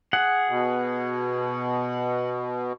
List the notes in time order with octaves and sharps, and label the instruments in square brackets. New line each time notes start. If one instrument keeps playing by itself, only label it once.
[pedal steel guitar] G#4 F#5
[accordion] B2